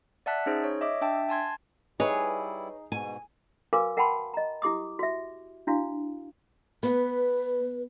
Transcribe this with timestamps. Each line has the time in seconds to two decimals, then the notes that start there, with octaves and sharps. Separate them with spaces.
0.26 D5 E5 F#5 A5 F#6 B6
0.46 C#4 D#4 G#4 C5
0.64 C#5
0.81 D#5 E5 D6
1.01 D4 E5 G5 A5
1.29 G#5 A5 C6 G#6
2.00 G3 D#4 E4 G#4 B4 C#5
2.92 G#2 B2 G#5
3.73 F#4 A#4 B4 F5 G#5 D6
3.97 A#4 F#5 G5 A5 B5 C6
4.34 D#5 A#5
4.62 E4 G4 D6 D#6
4.99 F#4 E5
5.67 D4 E4 F#4 F5
6.83 B3 B4